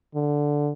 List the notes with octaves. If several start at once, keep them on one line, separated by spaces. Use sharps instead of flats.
D3